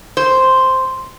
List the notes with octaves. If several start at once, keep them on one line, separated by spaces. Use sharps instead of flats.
C5